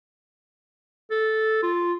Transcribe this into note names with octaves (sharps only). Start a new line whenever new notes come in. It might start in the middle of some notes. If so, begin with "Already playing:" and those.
A4
F4